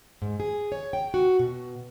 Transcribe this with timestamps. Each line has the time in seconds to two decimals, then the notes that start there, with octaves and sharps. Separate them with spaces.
0.22 G#2
0.40 G#4
0.72 C#5
0.93 G5
1.14 F#4
1.39 B2